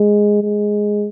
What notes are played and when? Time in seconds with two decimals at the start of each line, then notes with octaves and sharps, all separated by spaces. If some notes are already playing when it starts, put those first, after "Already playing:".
Already playing: G#3
0.42 G#3